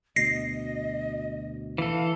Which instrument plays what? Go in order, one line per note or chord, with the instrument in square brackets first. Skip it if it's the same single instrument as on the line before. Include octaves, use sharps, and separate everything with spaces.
[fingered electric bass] D2 B2 [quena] D#5 [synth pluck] A#6 C7
[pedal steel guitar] E3 A4 [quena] F5